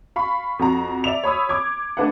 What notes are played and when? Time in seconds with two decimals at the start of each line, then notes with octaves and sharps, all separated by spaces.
0.16 F5 B5 C#6
0.59 F2 F#4 A#5
1.04 D5 E5 F7
1.24 C#5 B5 D#6 E6
1.49 D6 G#6
1.97 A3 D4 B4 F5 F#5